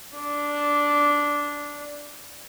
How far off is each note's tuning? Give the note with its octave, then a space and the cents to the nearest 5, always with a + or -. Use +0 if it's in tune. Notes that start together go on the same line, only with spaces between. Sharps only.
D4 -10